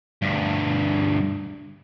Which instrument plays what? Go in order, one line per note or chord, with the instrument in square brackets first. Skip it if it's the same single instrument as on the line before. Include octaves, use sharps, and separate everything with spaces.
[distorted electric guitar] D2 G2